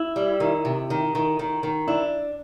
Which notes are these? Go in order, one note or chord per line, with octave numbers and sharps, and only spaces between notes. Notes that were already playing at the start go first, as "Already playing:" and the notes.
Already playing: E4
G3
D#3
C3
D#3
D#3
D#3
D#3
D4 E4